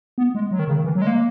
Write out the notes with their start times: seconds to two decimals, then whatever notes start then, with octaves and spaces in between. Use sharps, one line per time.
0.18 B3
0.35 G#3
0.51 F#3
0.59 D#3
0.68 C#3
0.76 D#3
0.84 E3
0.95 F#3
1.02 G#3
1.07 A#3